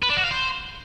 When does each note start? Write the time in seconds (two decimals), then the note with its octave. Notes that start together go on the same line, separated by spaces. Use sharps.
0.03 B4
0.10 D4
0.17 F#4
0.24 F5
0.31 C5